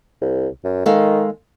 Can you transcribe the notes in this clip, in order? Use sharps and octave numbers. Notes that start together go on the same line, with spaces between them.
C2
F#2
D#3 G#3 A4 F5